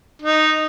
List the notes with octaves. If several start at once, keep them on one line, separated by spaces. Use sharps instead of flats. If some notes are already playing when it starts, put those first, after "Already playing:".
D#4